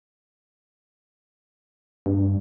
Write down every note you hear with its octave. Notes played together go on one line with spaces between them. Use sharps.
G2